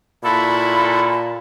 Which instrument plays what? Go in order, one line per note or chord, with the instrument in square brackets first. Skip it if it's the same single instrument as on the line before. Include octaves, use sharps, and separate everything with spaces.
[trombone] A#2 [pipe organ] E4 F#4 A4 [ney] B5